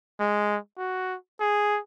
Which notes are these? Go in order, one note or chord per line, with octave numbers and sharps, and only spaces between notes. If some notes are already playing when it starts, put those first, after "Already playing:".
G#3
F#4
G#4